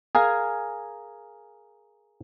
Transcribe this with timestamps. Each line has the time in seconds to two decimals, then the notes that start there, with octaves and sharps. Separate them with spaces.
0.15 G#4 A#4 F5 G#5